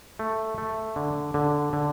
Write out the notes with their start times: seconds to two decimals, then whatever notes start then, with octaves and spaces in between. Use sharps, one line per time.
0.19 A3
0.58 A3
0.96 D3
1.34 D3
1.73 D3